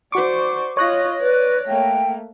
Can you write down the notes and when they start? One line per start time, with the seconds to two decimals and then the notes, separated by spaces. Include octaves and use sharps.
0.12 F#4 C5 D5 C#6 D6
0.77 F4 C#5 D#5 F#6 A#6
1.21 B4 D5
1.68 A3 A#3 G5